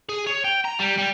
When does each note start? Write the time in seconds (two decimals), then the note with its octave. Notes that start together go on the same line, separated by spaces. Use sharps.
0.09 G#4
0.27 C#5
0.44 G5
0.65 A#5
0.79 G3
0.97 G3